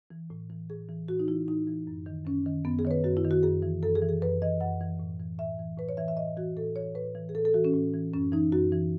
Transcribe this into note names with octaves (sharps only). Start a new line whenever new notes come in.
E3
A2
E3
A2 G#4
E3
A2 F#4
D#4
E3 E4
A2 D#4
E3
F#2
D#3
F#2 C#4
D#3
F#2 B3
G#4
D#3 C#5
B4
F#2 F#4
E4
D#3
F#4
F#2 G#4
E3
F#2 A4
G#4
E3
G#4
F#2 B4
E3 D#5
F#2 F#5
E3
A2
E3
A2 E5
E3
A2 B4
C#5
E3 E5
E5
A2 D#5
E3 F#4
A2 A4
E3 C#5
A2 B4
E3
G#4
A2 A4
A4
E3 F#4
C#4
A2
E3
F#2 C#4
E3 D#4
F#2 F#4
E3